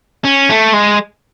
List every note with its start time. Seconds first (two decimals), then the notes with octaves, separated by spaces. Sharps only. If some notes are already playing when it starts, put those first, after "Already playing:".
0.25 C#4
0.49 A3
0.73 G#3